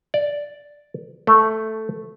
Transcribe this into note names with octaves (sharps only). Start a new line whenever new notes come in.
D5
A3